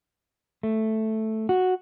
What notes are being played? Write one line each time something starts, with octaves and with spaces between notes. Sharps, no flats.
A3
F#4